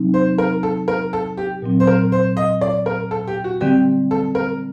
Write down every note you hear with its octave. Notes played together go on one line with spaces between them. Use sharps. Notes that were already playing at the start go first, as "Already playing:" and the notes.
Already playing: C3 F#3 C4 D#4
C5
A#4
A4
A#4
A4
G4
A#2 F#3 C4
C5
A#4
C5
D#5
D5
A#4
A4
G4
F#4
D3 G3 C4 G4
A4
A#4